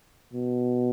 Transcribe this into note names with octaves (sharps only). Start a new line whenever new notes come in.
B2